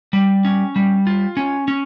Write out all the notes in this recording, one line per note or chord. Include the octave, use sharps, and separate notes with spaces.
G3
C#4
G3
F4
C#4
C#4